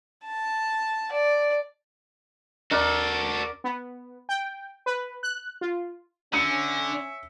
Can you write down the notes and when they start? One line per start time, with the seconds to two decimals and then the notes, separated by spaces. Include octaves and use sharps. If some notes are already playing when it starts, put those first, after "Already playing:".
0.24 A5
1.12 D5
2.71 D#2 F#4 A4 A#4 D5
3.64 B3
4.29 G5
4.86 B4
5.23 F#6
5.61 F4
6.33 D3 C#4 E5 C#7 D#7